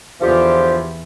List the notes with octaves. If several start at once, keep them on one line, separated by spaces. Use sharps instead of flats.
E2 D3 E3 F3 F4 G4